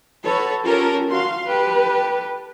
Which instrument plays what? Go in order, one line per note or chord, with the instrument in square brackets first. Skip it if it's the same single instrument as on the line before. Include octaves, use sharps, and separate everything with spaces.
[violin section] F#4 B4 C#5 [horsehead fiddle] A4
[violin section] C#4 A4 A#4 [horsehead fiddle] F4 G4
[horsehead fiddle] F#4 F5 [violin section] C6
[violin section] G4 A4 [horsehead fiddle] B4